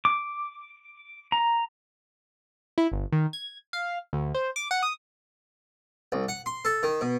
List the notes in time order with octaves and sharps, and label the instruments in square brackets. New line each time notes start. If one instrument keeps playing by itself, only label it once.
[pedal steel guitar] D6
A#5
[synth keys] E4
G1
D#3
G#6
F5
D2
C5
D6
F#5
D#6
[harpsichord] C2
F#5
C6
A4
D#3
B2